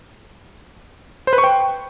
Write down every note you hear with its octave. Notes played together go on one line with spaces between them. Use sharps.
C5
B4
C#6
G5